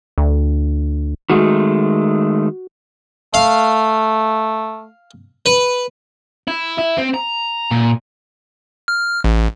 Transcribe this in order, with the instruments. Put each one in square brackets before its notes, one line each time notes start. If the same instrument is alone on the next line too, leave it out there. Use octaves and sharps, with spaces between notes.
[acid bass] D2
[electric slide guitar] D#3 G#3 A3 [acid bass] F#4
[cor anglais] A3 [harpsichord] F5
[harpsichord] B4
[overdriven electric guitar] E4
E4
C4
A#5
A#2
[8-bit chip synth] F6
A1